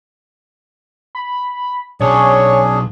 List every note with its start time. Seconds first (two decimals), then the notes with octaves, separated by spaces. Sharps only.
1.15 B5
2.00 B1 C#4 D4 G#4 C#5